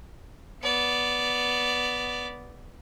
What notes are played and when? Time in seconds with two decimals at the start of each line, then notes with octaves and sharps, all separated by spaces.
0.63 B3 D5